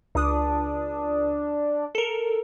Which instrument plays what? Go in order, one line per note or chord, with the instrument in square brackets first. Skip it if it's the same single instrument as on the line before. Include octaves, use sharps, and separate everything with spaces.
[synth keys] C#2 D#6 [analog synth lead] D4
[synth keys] A4 A#4